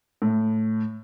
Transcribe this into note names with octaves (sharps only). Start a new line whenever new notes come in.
A2